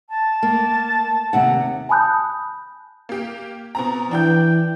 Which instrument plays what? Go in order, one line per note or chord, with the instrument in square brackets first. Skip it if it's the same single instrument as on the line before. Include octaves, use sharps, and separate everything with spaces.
[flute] A5
[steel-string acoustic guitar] A#3
D#2 C3 F#5
[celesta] G#5 A5 B5 D#6 F#6 G6
[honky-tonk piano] A#3 G4
B2 C4 A#5
[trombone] E3 [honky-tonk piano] D4 G5 G6